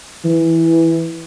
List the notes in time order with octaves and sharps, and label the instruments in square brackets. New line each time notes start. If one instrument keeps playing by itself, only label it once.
[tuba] E3